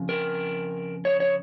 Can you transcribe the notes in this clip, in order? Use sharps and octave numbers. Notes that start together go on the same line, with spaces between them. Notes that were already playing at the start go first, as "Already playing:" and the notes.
Already playing: F2 C#3
A#4
C#5
C#5